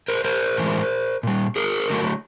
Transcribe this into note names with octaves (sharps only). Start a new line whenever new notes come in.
A#4 C5
A#4 C5
A2 E3 G#3
A#2 G3
G#4 A#4
D3 F#3 A3